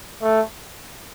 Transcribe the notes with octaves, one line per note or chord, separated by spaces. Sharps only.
A3